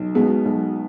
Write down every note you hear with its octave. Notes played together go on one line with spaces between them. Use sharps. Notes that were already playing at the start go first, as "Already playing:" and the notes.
Already playing: B1
B2 G#3 B3
B1